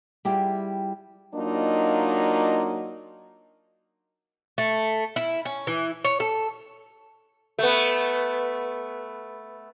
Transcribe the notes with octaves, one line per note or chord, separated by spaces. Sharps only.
G3 E4 F4 G4 G#4 F#5
F#3 A#3 D4 D#4 F4 D#5
A3
E4
C#4
E3
C#5
A4
A3 B3